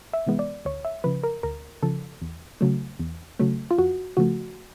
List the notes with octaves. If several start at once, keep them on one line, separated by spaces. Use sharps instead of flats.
E5
C3 E3 G#3 B3
D5
D2 C#5
E5
C#3 F3 B4
A#4
D2 A#4
C#3 F3 A4
E2
C#3 F#3 A3
E2
C#3 F#3 A3
F4
F2 F#4
C#3 F3 A3 F#4